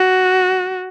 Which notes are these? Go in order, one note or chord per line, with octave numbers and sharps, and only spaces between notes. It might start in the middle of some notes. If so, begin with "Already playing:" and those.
Already playing: F#4